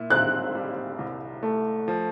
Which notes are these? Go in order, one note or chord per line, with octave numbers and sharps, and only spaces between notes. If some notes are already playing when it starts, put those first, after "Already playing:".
Already playing: A#2 E4
C4 F#6
G3
C2
A3
F3